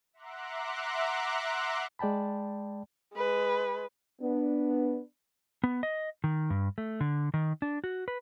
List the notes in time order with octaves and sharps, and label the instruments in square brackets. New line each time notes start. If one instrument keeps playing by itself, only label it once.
[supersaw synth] E5 F#5 A#5 C6 D6 F#6
[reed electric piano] G#3 D5 G5 A5 B5
[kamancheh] G#3 B4
[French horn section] B3 D4
[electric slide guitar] B3
D#5
D#3
G2
A3
D3
D#3
D4
F#4
B4